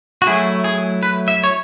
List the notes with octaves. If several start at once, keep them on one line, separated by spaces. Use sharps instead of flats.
F#4
F#3 A3 E4 G#4
G#4
B4
E5
C#5